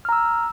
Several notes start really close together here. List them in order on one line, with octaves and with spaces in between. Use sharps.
F6 A#5 E6